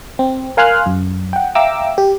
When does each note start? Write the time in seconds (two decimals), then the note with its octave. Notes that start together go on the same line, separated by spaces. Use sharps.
0.19 C4
0.57 A#4 F5 G#5 C6 F6 F#6
0.86 F#2
1.33 F#5 G5
1.55 E5 F5 G5 A#5 D6 E6
1.98 G4